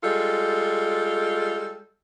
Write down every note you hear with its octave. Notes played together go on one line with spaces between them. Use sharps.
G3 G#3 F4 A4